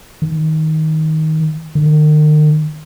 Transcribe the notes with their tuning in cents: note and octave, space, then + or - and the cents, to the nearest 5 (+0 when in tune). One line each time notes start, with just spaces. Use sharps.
D#3 +15
D#3 -40